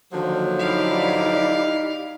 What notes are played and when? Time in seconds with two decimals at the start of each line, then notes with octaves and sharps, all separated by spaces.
0.12 D#2 D3 F3 F#3
0.59 D#4 E4 G4 D5 F5